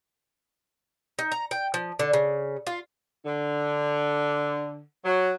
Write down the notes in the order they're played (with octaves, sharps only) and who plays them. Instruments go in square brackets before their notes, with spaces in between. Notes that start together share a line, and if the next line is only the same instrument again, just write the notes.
[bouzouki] D#4
A#5
G5
F3
D3
C#3
F4
[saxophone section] D3
F#3